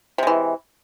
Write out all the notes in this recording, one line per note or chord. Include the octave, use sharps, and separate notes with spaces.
C3 E3 G#3